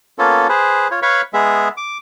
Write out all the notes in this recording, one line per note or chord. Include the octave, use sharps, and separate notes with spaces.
A#3 B3 C#4 F4 A4
G#4 B4 C5
F4 C#5
B4 C#5 F5 B5 C#6
G#3 B3 G#4 E5
D6